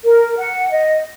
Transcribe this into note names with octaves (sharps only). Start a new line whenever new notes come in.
A#4
F#5
D#5